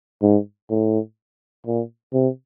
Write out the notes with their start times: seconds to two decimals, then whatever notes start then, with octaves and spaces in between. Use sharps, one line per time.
0.22 G#2
0.70 A2
1.66 A#2
2.13 C3